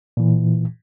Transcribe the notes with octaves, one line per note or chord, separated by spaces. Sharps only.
A#2 E3